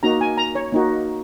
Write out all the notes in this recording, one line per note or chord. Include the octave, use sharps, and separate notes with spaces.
A#3 D#4 F#4 A#5
G#5
A#5
C#5
A#3 D#4 F#4